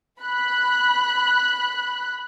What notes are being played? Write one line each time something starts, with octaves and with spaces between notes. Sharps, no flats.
B5 F#6